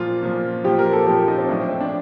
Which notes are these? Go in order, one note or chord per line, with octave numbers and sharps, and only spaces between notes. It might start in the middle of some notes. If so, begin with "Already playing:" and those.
Already playing: A#2 F3 F4
A#2 F3
A#2 F3 G4
A#4
A4
A#2 F3 G4
D#4
C4
A2 F3 D4
C4
C4
D4